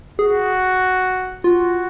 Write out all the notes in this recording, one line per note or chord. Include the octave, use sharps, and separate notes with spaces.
F#4 G#4
F4 F#4